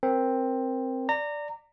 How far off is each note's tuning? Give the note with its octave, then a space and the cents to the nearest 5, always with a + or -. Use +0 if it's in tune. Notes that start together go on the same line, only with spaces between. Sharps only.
C4 +5 A#4 +10
D5 +0 A#5 -25